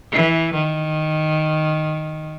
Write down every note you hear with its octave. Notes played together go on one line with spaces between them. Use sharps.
E3
D#3